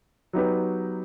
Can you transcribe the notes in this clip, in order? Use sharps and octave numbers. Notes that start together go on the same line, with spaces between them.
F#3 B3 D#4 G4 B4